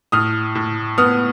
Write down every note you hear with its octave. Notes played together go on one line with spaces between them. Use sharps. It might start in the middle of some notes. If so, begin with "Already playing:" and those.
A2 D#6 F6
A2
B3 D#6 F6